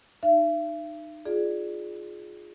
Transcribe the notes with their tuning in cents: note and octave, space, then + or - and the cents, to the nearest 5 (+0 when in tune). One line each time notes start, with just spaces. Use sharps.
D#4 -25 E5 +45
F4 +10 G#4 +0 D5 +10